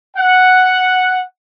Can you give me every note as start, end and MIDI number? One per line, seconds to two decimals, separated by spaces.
0.17 1.22 78